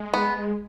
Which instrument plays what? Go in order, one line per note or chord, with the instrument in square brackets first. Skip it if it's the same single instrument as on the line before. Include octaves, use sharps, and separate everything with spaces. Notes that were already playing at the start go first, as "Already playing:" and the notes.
Already playing: [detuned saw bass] G#3
[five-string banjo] B3